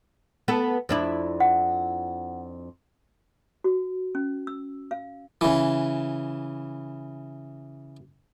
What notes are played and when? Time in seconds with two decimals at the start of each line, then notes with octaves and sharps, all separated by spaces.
0.48 B3 A4
0.89 F2 D4 E4
1.40 F#5
3.64 F#4
4.15 C#4
4.47 E6
4.91 F5
5.41 C#3 E3